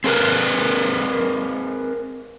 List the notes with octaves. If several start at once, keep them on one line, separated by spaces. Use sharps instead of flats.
C4 G#4 A#4 B4